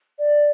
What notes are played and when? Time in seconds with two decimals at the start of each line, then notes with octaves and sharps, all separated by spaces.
0.19 D5